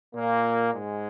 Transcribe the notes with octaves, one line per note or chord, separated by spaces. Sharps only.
A#2 A#3
G#2 G#3